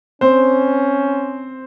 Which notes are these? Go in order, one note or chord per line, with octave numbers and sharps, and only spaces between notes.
C4 C#4 C5